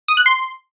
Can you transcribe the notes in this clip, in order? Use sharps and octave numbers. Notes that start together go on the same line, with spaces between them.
D#6
F#6
C6